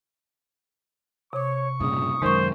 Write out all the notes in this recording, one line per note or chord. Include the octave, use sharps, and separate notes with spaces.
C3 C#5 C#6 D6
G2 A#2 C#3 D#6
F#2 D#3 G#3 A#4 C5 C#6